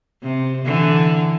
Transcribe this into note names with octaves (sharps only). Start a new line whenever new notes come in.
C3
D3 E3